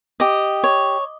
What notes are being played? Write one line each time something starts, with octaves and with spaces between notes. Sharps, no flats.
G4 D#5
C#5